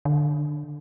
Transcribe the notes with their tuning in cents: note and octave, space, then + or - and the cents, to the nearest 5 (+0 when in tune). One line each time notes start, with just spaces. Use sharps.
D3 +15